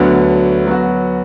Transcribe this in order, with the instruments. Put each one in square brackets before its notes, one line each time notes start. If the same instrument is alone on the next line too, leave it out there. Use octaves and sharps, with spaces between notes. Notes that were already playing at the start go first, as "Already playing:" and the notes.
Already playing: [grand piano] D2 D3 F#3 B3
F#3 B3 F#4